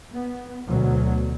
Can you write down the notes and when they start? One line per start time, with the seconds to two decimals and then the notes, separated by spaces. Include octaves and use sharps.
0.14 B3
0.68 D2 B2 F#3